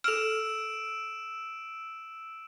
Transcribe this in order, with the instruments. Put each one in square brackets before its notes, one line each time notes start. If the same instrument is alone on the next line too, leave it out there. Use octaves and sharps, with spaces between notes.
[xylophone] A4 F6 [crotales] E6 D7 E7